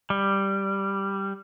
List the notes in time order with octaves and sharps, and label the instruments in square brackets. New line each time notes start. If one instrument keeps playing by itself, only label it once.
[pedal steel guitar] G3